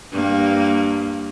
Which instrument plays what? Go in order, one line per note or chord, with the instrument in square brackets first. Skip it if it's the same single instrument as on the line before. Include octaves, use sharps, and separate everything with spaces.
[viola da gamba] G2 A#3